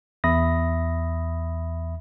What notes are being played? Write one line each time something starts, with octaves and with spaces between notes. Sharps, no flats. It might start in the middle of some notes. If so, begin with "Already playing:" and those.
E2 E5 B5 D#6 A#6